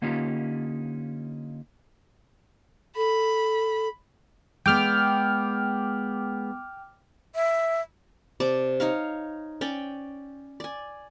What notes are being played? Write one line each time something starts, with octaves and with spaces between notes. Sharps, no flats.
D3 A#3 C#4 D#4 F4 G4
A4 B5
G#3 B3 G5 D6 F6
E5
C3 D5 A5 D6
D#4 C#5 F5
C#4 D5 G5
D5 G#5